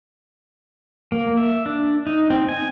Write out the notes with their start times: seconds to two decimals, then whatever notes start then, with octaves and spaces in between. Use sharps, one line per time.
1.12 A#3
1.37 E5
1.66 D4
2.07 D#4
2.30 C4
2.49 G#5